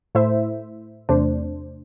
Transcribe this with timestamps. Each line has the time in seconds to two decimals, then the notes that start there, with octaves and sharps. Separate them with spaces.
0.15 A2 A3 E4 C5 E5
1.09 E2 C3 A3 D4 C5